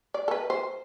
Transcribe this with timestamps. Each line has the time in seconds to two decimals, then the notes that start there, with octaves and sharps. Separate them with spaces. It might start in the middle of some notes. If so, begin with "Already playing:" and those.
0.14 D5
0.28 A4
0.31 B4
0.50 C5